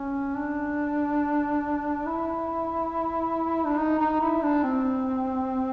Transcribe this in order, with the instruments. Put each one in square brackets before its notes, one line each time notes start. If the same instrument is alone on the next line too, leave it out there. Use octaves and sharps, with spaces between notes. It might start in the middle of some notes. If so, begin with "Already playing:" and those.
Already playing: [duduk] C#4
D4
E4
D4
D#4
D#4
E4
D4
C4